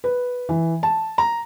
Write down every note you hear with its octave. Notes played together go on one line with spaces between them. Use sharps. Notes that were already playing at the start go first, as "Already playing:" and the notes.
B4
E3
A5
A#5